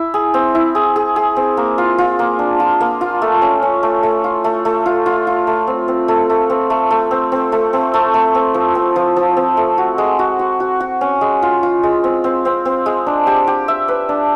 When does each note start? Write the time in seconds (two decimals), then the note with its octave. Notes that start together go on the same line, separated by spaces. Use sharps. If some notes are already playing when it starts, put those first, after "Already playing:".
Already playing: E4
0.14 G#4
0.34 C4
0.55 E4
0.75 G#4
0.96 G#4
1.16 G#4
1.36 C4
1.57 A#3
1.78 F4
1.98 F4
2.19 A#3
2.39 D4
2.60 F4
2.81 A#3
3.01 F4
3.22 A3
3.42 C#4
3.62 C#4
3.83 A3
4.03 A3
4.24 F4
4.44 A3
4.65 A3
4.86 F4
5.06 F4
5.27 F4
5.47 A3
5.67 C4
5.88 C4
6.08 A3
6.30 A3
6.50 C4
6.70 A3
6.91 A3
7.11 C4
7.32 C4
7.52 A3
7.73 C4
7.94 A3
8.14 A3
8.35 C4
8.54 F3
8.75 C4
8.96 F3
9.16 F3
9.37 C4
9.57 A3
9.78 F#4
9.98 G#3
10.19 F#4
10.39 F#4
10.60 F#4
10.80 F#4
11.01 C#4
11.21 G#3
11.42 F4
11.63 F4
11.83 G#3
12.04 C4
12.24 C4
12.45 C4
12.65 C4
12.86 G#3
13.07 D4
13.27 G4
13.47 G4
13.68 E5
13.88 B4
14.09 D4